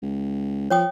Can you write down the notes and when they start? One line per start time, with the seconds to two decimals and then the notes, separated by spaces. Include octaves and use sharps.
0.02 C#2
0.70 F3 C#5 G5 D#6